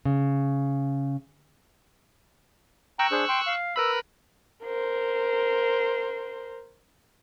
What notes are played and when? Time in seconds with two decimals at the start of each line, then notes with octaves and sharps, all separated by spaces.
0.05 C#3
2.99 G5 A#5 C#6 E6 F#6
3.11 D4 G#4 C5
3.29 G5 C6
3.47 F5
3.76 A#4 B4 B5 E6
4.64 A#4 C5